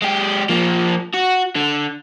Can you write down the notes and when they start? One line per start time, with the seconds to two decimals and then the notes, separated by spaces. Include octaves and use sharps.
0.02 G#3 G4
0.49 F3 A#3
1.14 F#4
1.56 D3